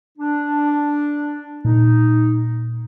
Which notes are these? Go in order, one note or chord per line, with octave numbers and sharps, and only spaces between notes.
D4
A#2 D#4